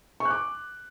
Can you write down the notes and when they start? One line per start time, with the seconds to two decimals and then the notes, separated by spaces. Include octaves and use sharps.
0.20 C#6
0.25 F#6
0.30 D6